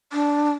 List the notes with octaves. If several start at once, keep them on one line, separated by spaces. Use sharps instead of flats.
D4